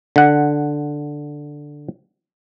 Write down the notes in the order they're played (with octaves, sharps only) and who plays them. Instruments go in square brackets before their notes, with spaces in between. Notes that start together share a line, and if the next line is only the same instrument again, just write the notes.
[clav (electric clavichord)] D3 F#5